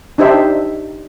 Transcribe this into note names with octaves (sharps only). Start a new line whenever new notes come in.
D4 D#4 G4 C5 E5